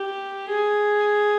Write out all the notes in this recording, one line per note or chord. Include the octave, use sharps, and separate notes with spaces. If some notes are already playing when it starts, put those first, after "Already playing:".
Already playing: G4
G#4